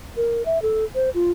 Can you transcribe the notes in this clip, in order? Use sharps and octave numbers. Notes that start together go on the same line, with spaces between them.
A#4
E5
A4
C5
F4